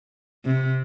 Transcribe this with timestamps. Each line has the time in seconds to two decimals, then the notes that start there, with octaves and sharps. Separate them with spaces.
0.45 C3